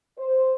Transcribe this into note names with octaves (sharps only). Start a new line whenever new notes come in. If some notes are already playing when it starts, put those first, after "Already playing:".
C5